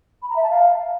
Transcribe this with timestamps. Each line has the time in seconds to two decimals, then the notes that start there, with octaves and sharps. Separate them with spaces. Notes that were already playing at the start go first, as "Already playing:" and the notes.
0.22 B5
0.29 A#5
0.36 E5
0.43 A5
0.50 F5